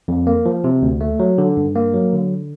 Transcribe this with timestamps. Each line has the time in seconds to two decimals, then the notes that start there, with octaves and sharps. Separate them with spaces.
0.08 F2
0.27 A#3
0.46 F3
0.64 C3
0.82 D2
1.01 A3
1.20 F#3
1.38 D3
1.57 G2
1.75 A#3
1.94 F#3
2.13 D3